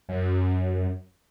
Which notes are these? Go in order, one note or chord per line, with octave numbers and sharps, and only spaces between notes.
F#2